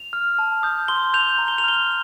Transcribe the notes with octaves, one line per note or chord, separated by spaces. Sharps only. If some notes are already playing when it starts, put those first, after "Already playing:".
Already playing: F7
F6
A5
D#6 G6
C6 G7
G6 F7
A#5
G7
F7
F6 G7